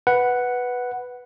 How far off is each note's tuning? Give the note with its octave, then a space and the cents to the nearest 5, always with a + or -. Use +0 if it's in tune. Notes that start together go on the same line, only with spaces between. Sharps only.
B4 +0 F#5 +0